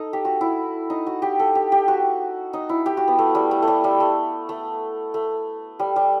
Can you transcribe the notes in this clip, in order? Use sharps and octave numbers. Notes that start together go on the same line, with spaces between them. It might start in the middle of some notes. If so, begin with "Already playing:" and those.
Already playing: D#4 A4
G4
F#4
E4
D#4
F#4
G4
A4
G4
G4
F#4
D#4
E4
G4
F#4
B3
A3
G3
A3
A3
G3
G3
A3
A3
A3
G3
G3